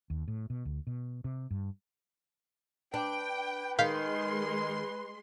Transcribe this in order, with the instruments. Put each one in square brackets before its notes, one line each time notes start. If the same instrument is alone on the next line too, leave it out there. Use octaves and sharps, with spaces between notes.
[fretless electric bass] D#2
A2
B2
D2
B2
C3
G2
[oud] D4 [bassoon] B4 [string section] G5
[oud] D#3 [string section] G#3 C6 [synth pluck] F5 G6 B6